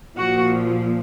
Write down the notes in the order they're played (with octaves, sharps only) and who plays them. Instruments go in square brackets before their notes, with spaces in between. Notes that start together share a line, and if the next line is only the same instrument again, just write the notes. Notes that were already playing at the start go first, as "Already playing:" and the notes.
[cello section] A#2 F3 F#4